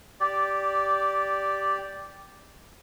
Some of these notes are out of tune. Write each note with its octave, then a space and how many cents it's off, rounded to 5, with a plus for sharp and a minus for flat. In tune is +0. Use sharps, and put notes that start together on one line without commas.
G4 +0 D5 -10